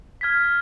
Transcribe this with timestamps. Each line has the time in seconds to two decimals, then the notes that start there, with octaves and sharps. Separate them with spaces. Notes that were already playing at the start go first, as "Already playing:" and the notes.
0.21 F6 G#6 B6